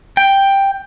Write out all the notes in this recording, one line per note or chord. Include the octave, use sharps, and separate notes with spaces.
G5